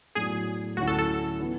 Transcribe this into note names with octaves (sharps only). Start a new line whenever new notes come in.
A2 F#3 B3 D4 G#4
D2 D3 F#3 C#4 E4 F#4
A4
A4
E3 B3 E4